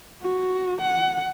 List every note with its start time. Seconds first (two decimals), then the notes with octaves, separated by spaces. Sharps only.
0.22 F#4
0.81 F#5